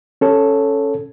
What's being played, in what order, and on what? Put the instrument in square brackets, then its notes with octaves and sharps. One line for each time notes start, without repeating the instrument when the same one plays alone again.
[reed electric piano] C#4 A4 C#5